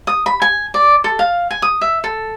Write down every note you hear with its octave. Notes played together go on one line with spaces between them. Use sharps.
D#6
B5
G#5
D5
A4
F5
G#5
D#6
E5
A4